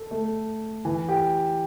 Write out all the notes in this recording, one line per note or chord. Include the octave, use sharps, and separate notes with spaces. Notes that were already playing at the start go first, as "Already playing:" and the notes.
Already playing: A4
A3
E3
G4